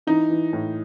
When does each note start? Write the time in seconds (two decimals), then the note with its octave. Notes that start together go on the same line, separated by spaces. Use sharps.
0.07 E3 D#4
0.30 E3
0.53 A2